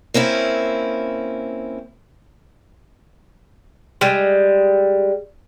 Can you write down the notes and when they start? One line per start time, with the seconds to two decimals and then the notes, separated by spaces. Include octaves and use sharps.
0.14 A#3 C4 C#4 E4
4.01 G3 G#3